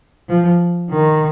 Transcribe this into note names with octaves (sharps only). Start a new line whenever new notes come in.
F3
D#3